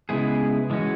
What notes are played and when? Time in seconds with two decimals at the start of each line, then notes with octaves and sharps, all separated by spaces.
0.09 C#3 G#3 B3 E4 G#4
0.70 E3 G#3 C#4 F#4